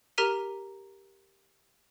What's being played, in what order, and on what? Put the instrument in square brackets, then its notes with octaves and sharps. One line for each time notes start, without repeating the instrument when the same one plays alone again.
[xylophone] G4 A#4 A#5 F6 B6 D#7